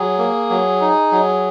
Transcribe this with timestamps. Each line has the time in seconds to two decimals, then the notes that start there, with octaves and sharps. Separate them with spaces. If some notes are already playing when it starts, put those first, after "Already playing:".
Already playing: F#3 G#4
0.19 A#3
0.50 F#3
0.81 D#4
1.12 F#3